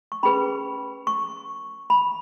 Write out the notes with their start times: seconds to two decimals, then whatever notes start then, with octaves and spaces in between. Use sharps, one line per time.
0.12 C#6
0.23 C#4 G#4 B4 B5
1.07 C#6
1.90 B5